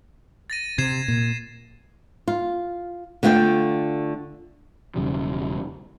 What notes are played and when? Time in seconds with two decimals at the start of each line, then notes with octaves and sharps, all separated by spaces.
0.50 A6 A#6 D#7
0.78 C3 G#6 C7 E7
1.08 A#2
2.28 F4
3.23 D3 A3 F4 F5 G5
4.96 E1 C#3 F#3 G3